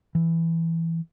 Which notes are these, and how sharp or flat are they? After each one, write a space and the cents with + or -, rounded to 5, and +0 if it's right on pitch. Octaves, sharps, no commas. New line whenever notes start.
E3 +5